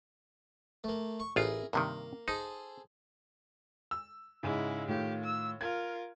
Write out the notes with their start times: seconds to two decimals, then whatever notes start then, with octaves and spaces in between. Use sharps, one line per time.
0.84 A3 A#3
1.20 C#6
1.36 A1 E4 F4 G#4 A#4
1.73 G2 C3 D#3 A#3
2.28 D#4 G#4 A4 C5
3.91 E6
4.43 G#2 C#3 G#3 E4
4.88 A2 D#3 F4 G4
5.24 E6
5.61 F4 A#4 G#6